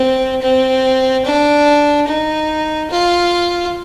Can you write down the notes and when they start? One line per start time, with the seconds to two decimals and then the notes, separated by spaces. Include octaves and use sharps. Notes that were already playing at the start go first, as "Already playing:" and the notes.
Already playing: C4
0.42 C4
1.25 D4
2.08 D#4
2.90 F4